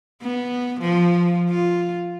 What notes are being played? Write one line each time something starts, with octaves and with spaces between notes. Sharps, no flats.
B3
F3
F4